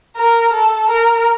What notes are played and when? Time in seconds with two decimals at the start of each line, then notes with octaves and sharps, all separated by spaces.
0.16 A#4
0.53 A4
0.90 A#4